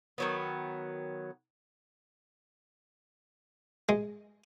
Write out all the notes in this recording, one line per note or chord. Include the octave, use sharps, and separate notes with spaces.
D#3 F#3 B3
G#3